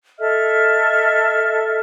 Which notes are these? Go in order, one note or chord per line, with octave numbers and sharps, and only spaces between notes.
A4 D#5 E5 F6